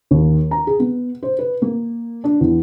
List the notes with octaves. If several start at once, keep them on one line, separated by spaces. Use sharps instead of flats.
D#2
A#5
G#4
B3
C5
B4
A#3
D4
E2